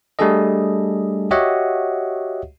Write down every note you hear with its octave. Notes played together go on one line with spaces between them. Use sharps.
G3 A3 D4 G#4 A4 D#5
F#4 G4 C#5 D#5 E5 F#5